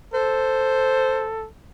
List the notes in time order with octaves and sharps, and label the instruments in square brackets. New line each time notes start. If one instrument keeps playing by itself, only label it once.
[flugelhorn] A4 [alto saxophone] C5